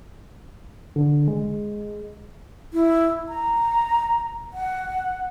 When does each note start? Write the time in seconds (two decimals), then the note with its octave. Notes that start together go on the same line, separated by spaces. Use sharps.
0.96 D3
1.28 G#3
2.74 E4
3.29 A#5
4.54 F#5